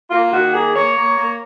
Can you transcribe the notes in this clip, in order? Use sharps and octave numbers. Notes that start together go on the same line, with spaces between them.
A#3 F4
D#3 F#4
A#3 G#4
A#3 C#5
A#3
A#3